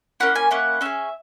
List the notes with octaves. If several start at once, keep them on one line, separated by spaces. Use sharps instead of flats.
A#3 C#4 E4 F#5
G#5
A#3 C#4 E4 F#5
C#4 G#4 E5